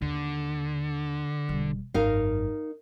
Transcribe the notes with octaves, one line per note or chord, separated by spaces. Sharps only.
D#2 D3
E1 G3
G#1 F#2 D#4 A#4 F5